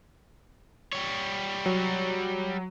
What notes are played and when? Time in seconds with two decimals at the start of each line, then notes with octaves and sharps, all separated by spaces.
0.93 G3 C#5
1.66 F#3